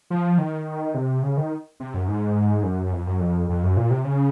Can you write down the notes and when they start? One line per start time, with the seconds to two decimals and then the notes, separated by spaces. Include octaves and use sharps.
0.10 F3
0.38 D#3
0.94 C3
1.23 C#3
1.37 D#3
1.80 C3
1.94 F#2
2.08 G#2
2.63 F#2
2.92 F2
3.07 F#2
3.20 F2
3.49 F2
3.63 F#2
3.77 A#2
3.91 C3
4.05 C#3